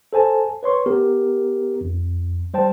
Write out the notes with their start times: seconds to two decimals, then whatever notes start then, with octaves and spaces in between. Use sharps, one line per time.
0.13 A4 C5 G#5 A5
0.63 B4 C#5 C6 C#6
0.86 B3 G4 A#4
1.81 F2
2.54 G3 C5 G5 A5